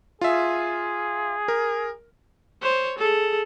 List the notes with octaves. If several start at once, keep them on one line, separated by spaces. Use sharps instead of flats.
F4 G#4 E5
A#4
C5 C#5
G#4 A4